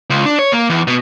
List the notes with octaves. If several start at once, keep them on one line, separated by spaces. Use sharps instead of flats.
C#2
D4
C#5
A#3
E2
B2